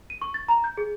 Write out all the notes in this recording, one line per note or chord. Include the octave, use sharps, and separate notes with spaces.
D#7
C#6
A6
A#5
G6
G#4